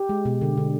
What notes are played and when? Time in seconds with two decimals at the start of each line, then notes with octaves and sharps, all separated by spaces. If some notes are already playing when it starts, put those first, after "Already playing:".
Already playing: G4
0.09 G#3
0.25 B2
0.41 D3
0.58 D3